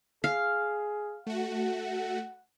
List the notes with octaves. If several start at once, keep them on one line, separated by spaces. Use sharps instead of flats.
G#4 F5
A3 F#4 F#5